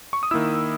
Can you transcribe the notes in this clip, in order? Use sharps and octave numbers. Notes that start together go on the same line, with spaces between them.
C#6
D#6
D#3 A#3 E4 E6